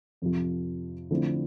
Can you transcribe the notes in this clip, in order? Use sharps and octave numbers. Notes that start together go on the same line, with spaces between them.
F2 C3 F3
D3 F3 A3 C4 E4